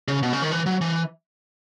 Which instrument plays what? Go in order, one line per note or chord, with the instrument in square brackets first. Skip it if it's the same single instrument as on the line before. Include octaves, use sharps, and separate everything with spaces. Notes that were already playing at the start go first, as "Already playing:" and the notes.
[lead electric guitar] C#3
B2
C#3
D#3
E3
F#3
E3